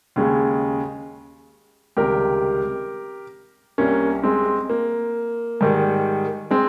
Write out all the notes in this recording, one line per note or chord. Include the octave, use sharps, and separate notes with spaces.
D#2 C#3 G#3
C#2 C3 D#3 G3 G4 A#4
C2 C3 G3 A#3 C#4
G#3 C4
A#3
G#2 D#3 G3
G#3 C4